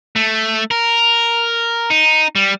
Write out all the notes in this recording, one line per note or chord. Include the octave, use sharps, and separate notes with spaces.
A3
A#4
D#4
G3